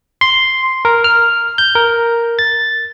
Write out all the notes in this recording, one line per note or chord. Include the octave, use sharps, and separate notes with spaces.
C6
A#4
F6
G6
A#4
A6